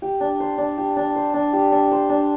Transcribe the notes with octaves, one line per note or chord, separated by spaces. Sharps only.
G4
D4
C5
D4
G4
D4
C5
D4
G4
D4
C5
D4